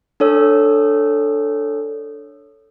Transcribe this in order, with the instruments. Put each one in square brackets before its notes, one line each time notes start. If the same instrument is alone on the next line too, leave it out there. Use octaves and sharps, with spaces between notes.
[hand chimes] D4 A4 C#5 E6